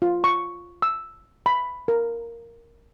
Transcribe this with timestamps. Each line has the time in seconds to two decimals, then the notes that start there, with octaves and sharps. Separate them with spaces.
0.02 F4
0.24 C#6
0.82 E6
1.46 B5
1.88 A#4